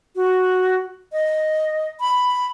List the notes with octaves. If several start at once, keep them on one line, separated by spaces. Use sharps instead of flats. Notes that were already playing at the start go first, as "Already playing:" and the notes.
F#4
D#5
B5